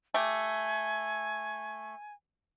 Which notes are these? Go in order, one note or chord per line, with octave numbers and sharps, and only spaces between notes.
A3 G4 G#5